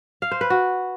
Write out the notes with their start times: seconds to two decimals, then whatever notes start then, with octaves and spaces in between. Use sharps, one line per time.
0.22 F5
0.31 C5
0.41 B4
0.50 F#4